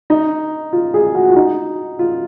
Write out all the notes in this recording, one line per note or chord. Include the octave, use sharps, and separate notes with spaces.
D#4
F4
G#4
F#4
F4
D#4
F4